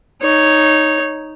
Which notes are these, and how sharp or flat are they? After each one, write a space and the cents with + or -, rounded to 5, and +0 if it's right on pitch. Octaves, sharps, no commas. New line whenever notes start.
D#4 +0 C#5 +0